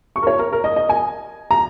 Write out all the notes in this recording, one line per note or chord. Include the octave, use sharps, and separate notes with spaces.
C#6
A#4
C#5
A#4
A#4
D#5
D#5
G#5
A#5